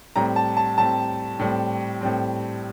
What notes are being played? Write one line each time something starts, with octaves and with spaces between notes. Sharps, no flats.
A2 G3 C4 A#5
A5
A5
A2 G3 C4 A5
A2 G3 C4
A2 G3 C4